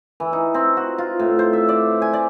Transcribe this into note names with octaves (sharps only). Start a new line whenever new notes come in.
E3
D#4
C4
F#4
F4
A2
C5
E5
D5
G#5
D5